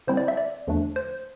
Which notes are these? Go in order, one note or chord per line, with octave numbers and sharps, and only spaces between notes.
D3 G3 C4 E4 C5
D5
E5
D5
E2 D3 F3 A3 D4
C5